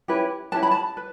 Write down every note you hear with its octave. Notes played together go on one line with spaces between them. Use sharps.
C#4 E4 G4 B4
C#4 E4 G4 B4 A5
B5
A5
B4